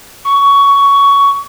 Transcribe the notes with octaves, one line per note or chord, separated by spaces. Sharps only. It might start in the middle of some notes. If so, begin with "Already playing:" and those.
C#6